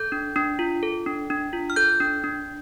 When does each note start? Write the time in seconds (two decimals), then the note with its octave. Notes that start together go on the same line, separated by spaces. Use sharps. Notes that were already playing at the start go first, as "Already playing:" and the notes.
Already playing: A4 G6
0.12 D4
0.36 D4
0.59 F4
0.83 A4
1.06 D4
1.30 D4
1.53 F4
1.70 F6
1.76 A4 G6
2.00 D4
2.24 D4